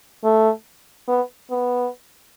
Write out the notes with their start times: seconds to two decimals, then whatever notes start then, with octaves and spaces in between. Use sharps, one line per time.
0.24 A3
1.08 B3
1.50 B3